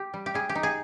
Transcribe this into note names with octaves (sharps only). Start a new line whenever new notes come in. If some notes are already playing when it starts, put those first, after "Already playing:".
Already playing: G4
G3
G4
G3 G#4
G4
D#4
G#4